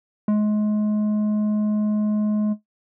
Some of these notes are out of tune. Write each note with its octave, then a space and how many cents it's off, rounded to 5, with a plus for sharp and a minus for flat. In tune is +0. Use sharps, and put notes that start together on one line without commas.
G#3 +30